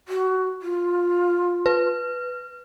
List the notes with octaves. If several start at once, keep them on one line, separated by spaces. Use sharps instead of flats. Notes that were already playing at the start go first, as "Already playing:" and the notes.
F#4
F4
B4